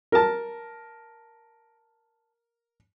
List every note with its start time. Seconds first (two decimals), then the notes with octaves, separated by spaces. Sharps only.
0.12 A#4 A5